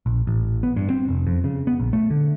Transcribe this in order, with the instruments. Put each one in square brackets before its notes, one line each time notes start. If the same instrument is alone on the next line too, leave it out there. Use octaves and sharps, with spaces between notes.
[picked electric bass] A#1
A1
B3
G2
C4
F1
F2
C#3
B3
A#1
A3
D3